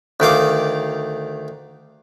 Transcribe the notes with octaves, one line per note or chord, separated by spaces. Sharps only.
D2 D#3 F5 D6